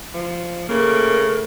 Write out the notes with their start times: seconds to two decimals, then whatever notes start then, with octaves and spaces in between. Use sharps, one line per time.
0.14 F3
0.69 C#3 A3 A#3 A#4